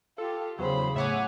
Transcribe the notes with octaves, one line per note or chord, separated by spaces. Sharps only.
F4 G4 A4
E2 C#3 F#3 C5 B5
A2 C#5 E5 F#5 G#5 D6